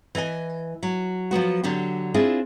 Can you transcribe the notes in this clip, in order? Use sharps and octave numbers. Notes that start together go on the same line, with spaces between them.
E3 B4 D#5 G#5
F#3
F3 F#3 B3 F#4
D3 F#3 D4 G4
C4 D4 E4 F4 G#4